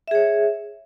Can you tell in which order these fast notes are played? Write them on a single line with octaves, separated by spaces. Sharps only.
E5 G#4 C#5